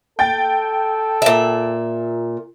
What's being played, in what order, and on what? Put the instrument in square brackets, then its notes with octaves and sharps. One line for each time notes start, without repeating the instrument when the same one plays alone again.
[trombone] A4 [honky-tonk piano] G5 A6
[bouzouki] A#2 E5